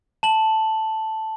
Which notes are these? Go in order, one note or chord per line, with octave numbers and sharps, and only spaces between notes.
A5 F#7